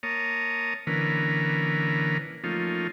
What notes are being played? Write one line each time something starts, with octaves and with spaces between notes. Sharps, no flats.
A#3 C#5 A5 A#5 D#6
D3 E3 A#3 C#4 A#4 B4
F3 A3 A#3 C#4 D#4 F4